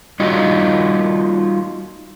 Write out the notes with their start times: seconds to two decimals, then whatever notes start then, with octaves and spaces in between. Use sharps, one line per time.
0.20 G3 D#4 F4 F#4 D#5